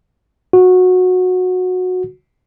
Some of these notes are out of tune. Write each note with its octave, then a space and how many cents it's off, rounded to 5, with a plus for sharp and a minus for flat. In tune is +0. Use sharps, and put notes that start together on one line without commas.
F#4 -15